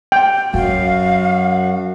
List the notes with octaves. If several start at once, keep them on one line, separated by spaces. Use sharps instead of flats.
G5
F#2 F#3 F#4 F5